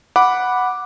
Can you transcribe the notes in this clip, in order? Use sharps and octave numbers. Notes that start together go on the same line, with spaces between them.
F#5 B5 D6